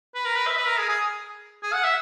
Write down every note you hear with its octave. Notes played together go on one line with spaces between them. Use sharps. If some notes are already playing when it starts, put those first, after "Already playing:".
B4
A#4
B4
E5
B4
A#4
G#4
G#4
G#4
F#5
E5